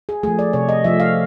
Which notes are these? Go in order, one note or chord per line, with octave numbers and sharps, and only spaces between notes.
G#4
F3 A3 G#4
D5
C3 C#5
D#5
F3 A3 E5
F5